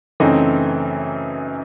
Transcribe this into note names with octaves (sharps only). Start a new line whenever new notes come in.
F#2 C#3 E3 A3 C4 D#4